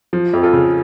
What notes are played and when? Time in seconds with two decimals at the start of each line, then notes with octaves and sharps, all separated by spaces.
0.13 F3
0.33 F2
0.43 F4 A4
0.53 C#3